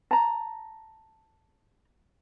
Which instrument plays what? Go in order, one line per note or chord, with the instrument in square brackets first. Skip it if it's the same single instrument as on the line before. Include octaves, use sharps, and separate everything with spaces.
[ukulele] A5 A#5